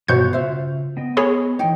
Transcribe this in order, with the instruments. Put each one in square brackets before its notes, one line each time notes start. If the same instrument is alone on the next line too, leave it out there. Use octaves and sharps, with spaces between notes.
[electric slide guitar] G2 B3 F4 [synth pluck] B2 G6 [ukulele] F#4 C5 C#5
[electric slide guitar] C#3 F4 [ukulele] C5 E5
[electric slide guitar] B3 D#5 G5
[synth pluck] G#4 B5 [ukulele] C#5
[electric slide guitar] E3 C#5 [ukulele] D#4 G5